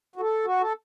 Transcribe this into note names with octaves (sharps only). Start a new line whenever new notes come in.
F#4
A4
F#4
A4